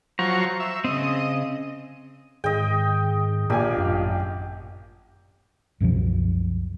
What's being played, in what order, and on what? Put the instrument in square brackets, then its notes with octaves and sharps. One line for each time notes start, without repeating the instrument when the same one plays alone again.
[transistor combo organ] F3 F#3 C#6 [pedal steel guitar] C5 A#5
[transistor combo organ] E5
[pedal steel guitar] C#3 C4 [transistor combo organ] D#5
[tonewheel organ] G#2 D#3 [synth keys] G#4 D#6 [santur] D#5 G5
[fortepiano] A#1 A#2 G#5 [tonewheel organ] F4 D#5 F5 [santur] G4
[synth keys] G#1 F#2 A2
[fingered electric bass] C2 F#2 B2 F3